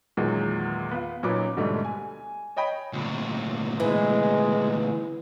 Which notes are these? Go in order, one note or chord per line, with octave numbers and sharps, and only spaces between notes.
E2 A#2 D#3 F#3 G#3
B3 F4
A#2 F#3 C#4 D#4 B4 D6
D2 G#2 B2 D3 G3 A3
G#5
C#5 D#5 G5 B5
D2 A#2
E3 G#3